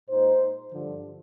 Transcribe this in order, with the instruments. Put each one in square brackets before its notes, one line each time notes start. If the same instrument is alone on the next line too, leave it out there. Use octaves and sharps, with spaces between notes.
[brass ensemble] A#2 G#3 D#4 C5
G2 D3 F3